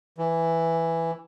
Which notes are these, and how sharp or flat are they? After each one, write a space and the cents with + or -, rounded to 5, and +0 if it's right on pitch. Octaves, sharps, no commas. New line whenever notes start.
E3 +5